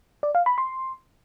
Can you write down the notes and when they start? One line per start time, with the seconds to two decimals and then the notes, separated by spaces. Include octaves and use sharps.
0.23 D5
0.35 F5
0.46 B5
0.58 C6